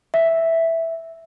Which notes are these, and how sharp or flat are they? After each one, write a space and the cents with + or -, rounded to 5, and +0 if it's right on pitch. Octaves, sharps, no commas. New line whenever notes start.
E5 -5